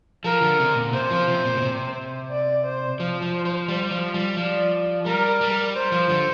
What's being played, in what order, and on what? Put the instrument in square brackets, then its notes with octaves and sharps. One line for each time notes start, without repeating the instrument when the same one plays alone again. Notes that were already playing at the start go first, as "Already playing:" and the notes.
[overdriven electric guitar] F3 [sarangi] A#4
[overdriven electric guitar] D3
C3
A#2
[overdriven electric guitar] C3 [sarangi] C5
[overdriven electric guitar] F3
C3
A#2
A#2
C3
[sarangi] D5
C5
[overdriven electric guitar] F3 [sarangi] C5
[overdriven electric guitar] F3
F3
G3
G3
F3
G3
[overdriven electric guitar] F3 [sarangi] D5
[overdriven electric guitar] G3 [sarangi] A#4
[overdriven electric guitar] G3
[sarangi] C5
[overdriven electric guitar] F3
D3